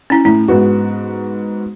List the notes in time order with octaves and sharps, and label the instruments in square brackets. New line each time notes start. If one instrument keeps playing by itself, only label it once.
[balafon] C#4 E4
[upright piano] A2 [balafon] E4
[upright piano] G#2 B3 F#4